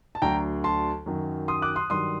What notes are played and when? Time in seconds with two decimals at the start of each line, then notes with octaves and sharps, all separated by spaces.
0.15 A5
0.22 D2 D3 F#3 G5 A#5
0.64 A5 C6
1.06 F#2 D#3 F#3
1.48 C6 D#6
1.62 D6 F#6
1.76 C6 D#6
1.90 G2 D#3 F#3 C6 D#6